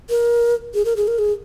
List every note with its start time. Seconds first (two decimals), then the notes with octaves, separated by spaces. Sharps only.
0.10 A#4
0.74 G#4
0.85 A#4
0.96 G#4
1.08 A#4
1.19 G#4